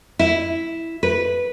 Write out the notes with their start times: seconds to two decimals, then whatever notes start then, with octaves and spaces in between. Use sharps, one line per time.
0.19 E4
1.03 B4